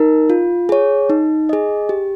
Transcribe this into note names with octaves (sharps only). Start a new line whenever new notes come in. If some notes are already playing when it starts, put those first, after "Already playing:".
Already playing: D#4 A#4
F4
G#4 C#5
D#4
G#4 D#5
G4